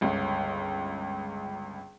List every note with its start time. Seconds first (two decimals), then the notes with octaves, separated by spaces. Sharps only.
0.01 G1 C#2